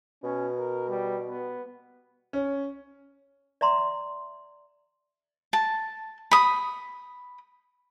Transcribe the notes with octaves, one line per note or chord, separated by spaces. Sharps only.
B2 C#4
A#4
G3
B3
C#4
D5 E5 A#5 C6
A5
B5 D#6